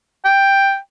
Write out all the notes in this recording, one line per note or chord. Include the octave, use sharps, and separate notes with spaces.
G5